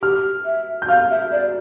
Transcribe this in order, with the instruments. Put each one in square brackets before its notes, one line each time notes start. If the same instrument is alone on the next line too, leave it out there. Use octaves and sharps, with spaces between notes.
[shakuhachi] G4 [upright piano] F6
[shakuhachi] E5
[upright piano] G6
[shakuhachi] F5 [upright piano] F6
[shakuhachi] E5
D5